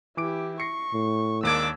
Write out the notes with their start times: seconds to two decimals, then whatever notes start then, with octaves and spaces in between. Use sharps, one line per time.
0.17 E3 E4 G4 D6 D7
0.60 C#6 A#6 C7 C#7
0.93 A2
1.43 D#2 G#3 A#3 D4 D6 E6 G#6